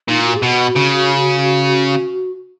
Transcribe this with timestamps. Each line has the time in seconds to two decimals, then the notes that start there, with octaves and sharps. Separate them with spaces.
0.08 A#2 D#4
0.26 F#4
0.36 G#4
0.42 B2 F#4
0.76 C#3